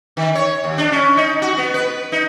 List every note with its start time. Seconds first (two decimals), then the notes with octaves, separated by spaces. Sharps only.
0.17 D#3
0.35 C#5
0.64 D#2
0.78 D4
0.92 C#4
1.17 D#4
1.42 F#4
1.58 B3
1.74 B4
2.12 D#4